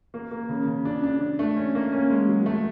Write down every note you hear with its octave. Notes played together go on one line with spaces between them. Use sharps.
A#3
A#3
C#3
C#3
D4
D4
D4
A3
C#4
A#3
C#4
G#3
F#3
A3